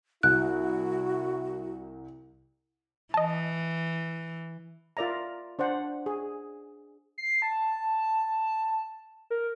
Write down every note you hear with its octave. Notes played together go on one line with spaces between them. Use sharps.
C2 E4 F#4 F#6
E3 D#5 A5
F4 A#4 D5 E5 A#5
D4 C5 D5 F#5
G#4
C7
A5
A#4